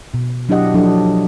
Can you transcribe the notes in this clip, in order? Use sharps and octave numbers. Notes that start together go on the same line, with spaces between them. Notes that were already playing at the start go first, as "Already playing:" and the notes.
B2
F#3 D4 E4 G4 D#5 F#5
F3 F#3 D4 A4